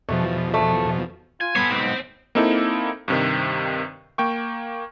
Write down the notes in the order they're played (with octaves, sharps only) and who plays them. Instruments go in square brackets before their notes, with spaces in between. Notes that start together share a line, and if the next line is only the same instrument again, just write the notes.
[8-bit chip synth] E2 B2 F3 [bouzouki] A3
[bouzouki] A3
[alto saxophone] F4 [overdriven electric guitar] G#5
[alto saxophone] B3 [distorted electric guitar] A4 C#5 [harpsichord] B5 C6
[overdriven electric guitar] B1 G#2 [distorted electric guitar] C4
[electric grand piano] A#3 C4 D#4 E4 A4
G2 C3 D#3
A#3 G5 C#6